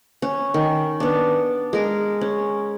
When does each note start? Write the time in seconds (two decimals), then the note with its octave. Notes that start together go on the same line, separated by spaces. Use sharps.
0.22 C#4
0.54 D#3
1.00 B3 D4
1.73 G#3 A#4
2.21 C#4